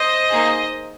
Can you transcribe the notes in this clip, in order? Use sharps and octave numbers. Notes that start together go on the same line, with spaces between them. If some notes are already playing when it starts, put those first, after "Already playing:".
Already playing: C5 D#5
A#3 D#4 G#4